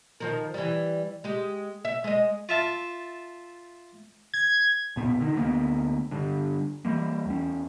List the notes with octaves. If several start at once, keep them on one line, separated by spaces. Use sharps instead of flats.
D#3 F3 A#4
E3 G3
G#3 G4
E5
G#3 D#5
F4 E5 A5
G#6
B1 F2 A#2 B3
D3 D#3
D2 A#3 B3
G2 D3
E3 F3 G3 A#3
E2 C#4